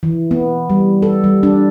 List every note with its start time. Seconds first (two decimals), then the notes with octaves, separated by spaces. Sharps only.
0.03 E3
0.31 B3
0.70 G3
1.02 A4
1.24 G3
1.43 D4